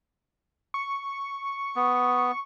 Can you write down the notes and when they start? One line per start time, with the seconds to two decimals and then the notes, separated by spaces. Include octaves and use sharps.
0.74 C#6
1.76 B3